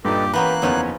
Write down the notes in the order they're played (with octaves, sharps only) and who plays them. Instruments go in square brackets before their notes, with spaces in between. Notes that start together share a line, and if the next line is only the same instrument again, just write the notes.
[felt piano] G2 A#2 [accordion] D#4 A4 B4 [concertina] G4
[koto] E3 B3 C#4 [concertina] A#3 F#6 [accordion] G4 B4 [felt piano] A#5
[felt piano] F#1 E2 B3 [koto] F3 C#4 D#4 [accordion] C#5